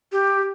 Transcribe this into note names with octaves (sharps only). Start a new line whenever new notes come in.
G4